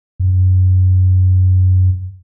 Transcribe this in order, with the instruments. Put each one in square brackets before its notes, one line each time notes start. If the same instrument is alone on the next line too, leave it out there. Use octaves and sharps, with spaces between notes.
[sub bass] F#2